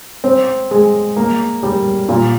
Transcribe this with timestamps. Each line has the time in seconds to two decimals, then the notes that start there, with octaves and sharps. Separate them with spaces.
0.24 C4
0.71 G#3
1.17 A#3
1.63 G3
2.09 A#2